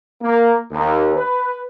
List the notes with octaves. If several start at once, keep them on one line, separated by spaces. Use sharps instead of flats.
A#3
D#2
B4